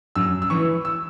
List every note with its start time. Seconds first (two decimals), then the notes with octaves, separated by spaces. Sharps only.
0.15 F#2 E6
0.42 E6
0.50 E3 C#6
0.85 E6